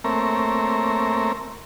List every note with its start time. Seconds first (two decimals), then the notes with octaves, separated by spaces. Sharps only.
0.04 A3 A#3 C4 A#4 C#5 E5